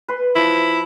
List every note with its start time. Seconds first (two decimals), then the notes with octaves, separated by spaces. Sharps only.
0.08 B4 C6
0.35 F3 E4